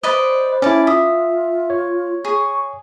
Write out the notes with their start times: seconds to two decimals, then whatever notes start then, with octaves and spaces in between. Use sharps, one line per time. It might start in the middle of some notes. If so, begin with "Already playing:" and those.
0.03 B4 C5 D5 D#5
0.62 C#4 E4 D5 A5
0.87 F4 E5 D#6
1.70 C#5
2.25 G#4 C#6